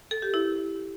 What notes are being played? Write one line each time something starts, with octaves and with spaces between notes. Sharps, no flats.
A4
G4
E4